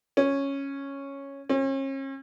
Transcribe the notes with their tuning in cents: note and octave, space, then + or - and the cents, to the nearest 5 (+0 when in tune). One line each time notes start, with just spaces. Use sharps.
C#4 -5
C#4 -40